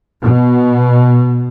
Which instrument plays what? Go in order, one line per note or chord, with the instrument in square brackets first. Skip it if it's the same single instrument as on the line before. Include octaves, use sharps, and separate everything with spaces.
[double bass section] B2